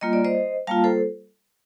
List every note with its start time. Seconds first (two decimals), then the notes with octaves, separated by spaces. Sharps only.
0.01 G3 A#3 F4 D#5
0.13 D5
0.25 C5 D#5
0.67 G3 A#3 F4 F5 A5
0.84 A4 C5